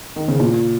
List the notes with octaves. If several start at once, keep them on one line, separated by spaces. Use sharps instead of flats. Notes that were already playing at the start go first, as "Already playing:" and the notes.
D#3
C#3
A#2